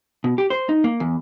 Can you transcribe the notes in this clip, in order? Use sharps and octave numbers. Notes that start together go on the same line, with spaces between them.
B2
G4
C5
D#4
A#3
E2